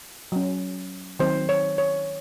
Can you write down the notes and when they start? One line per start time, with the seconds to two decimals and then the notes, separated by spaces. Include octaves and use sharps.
0.32 F#3 C#4
1.19 D#3 F#3 C4 C5
1.49 C#5
1.78 C#5